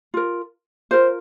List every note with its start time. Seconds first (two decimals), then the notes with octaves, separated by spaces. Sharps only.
0.14 F4 A#4
0.91 F4 A#4 C5